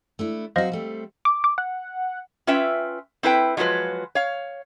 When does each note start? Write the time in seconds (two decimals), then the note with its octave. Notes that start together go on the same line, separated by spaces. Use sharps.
0.19 A3 D4 E4
0.56 F#3 C4 F#4 C5 D#5 F5
0.72 G3 A3 C4
1.25 D6
1.44 D6
1.58 F#5
2.47 C#4 F4 B4 E5 G5
3.23 C4 E4 B4 G5
3.57 F3 F#3 G#3 F4 B4
4.15 C#5 F5